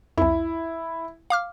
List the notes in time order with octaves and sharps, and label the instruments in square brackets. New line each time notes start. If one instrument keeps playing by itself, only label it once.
[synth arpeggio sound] C2 F2 [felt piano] E4
[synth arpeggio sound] F5 D6 F6